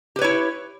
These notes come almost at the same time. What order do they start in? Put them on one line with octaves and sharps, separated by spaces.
G4 B4 C#5 E4